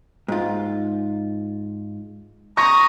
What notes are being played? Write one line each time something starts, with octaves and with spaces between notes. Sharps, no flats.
G#2 F4
A#5 C#6 D#6 A#6